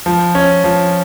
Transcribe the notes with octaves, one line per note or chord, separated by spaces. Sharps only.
F3
C#4
F3